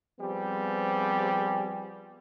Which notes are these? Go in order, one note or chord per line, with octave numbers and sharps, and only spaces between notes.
F3 G3 B3 C4 G4 G#4